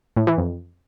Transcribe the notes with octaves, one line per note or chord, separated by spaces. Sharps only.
A2
E3
F2